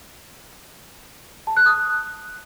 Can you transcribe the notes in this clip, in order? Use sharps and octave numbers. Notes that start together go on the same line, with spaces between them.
A5
F#6
D#6